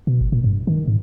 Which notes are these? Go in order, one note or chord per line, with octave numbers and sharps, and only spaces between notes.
B2
G1
A#2
G2
D#3
G#2